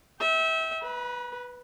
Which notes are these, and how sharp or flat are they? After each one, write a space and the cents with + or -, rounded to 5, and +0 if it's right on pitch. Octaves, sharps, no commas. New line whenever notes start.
E5 -30 G5 -10
B4 +0 B5 -45